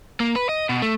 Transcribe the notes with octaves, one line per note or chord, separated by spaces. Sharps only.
A#3
B4
D#5
B2
A3